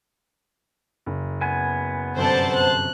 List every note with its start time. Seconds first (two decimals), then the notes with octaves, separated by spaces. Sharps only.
1.06 F#1
1.41 B3 G#5
2.17 G1 F#2 C3 A4 C5 D5 A5
2.55 F#6